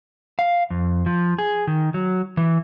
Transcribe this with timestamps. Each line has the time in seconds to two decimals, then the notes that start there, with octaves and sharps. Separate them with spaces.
0.39 F5
0.70 F2
1.06 F3
1.38 G#4
1.67 D#3
1.94 F#3
2.37 E3